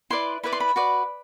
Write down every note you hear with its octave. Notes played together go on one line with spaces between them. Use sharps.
E4 B4 D5 C6
E4 B4 D5 B5
C6
B5
F#4 B4 D5